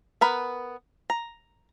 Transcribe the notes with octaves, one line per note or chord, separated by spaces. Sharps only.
B3 A#4 B4
A#5